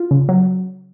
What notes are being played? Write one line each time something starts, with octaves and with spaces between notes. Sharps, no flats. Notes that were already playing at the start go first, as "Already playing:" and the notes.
Already playing: F4
C#3
F#3